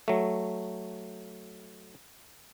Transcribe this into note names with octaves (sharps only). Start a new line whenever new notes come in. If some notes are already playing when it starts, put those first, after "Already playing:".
F#3 A3